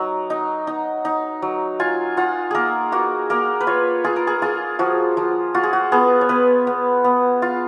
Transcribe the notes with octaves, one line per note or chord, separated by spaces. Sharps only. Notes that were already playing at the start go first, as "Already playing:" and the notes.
Already playing: F#3 D#4
D#4
D#4
D#4
F#3
F4 G#5
F4 F#5
A#3 G#4 A#4
A#3 F#4
A#3 A#4
B4
F4 C#5
F4 G#4
A#4
G#4
F4 G#4
F3 F#4
F3
F4 F#4
G#4
F#4
B3 G#4
C#5
B3 B4
B3
B3
F4